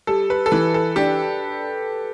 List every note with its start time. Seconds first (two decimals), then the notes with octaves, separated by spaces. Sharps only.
0.07 G3 A4
0.30 B4
0.46 A4
0.52 E3 B4
0.74 A4
0.96 D4 G4